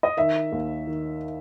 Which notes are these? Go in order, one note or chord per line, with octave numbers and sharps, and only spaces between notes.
D#5
D#3 E5
D#2
D#3